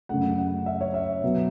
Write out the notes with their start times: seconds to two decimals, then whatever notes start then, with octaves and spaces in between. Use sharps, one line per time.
0.09 F#2 C#3 A3 F#5
0.38 F#5
0.66 E5
0.81 C#5
0.94 E5
1.23 B2 F#3 B3